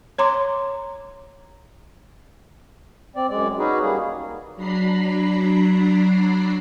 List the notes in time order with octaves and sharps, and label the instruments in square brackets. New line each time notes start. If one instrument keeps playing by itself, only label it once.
[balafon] C#5 A#5 C6 D6
[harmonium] C4 D5
F#2 G#3 D5
C#4 D#4 F#4 G#4 B4
G3 A#3 G#4
[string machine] F#3 D4 A#5 B5 C7